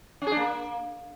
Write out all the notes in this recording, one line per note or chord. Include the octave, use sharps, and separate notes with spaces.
C#4
G#4
D4
A#3